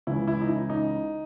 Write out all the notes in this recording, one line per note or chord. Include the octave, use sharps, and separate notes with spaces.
C#2 C#3 E3 G#3 E4
E4
D#4
E4
D#4